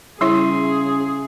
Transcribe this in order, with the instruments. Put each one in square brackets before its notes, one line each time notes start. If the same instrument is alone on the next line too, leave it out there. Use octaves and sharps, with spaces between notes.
[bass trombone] C#3 [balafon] G3 E4 C#5 [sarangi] G#4 [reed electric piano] E5 C6 E6